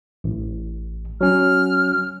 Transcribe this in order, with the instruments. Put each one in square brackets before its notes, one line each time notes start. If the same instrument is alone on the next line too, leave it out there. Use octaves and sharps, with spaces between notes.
[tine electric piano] A1
[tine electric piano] F#3 C#4 [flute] F6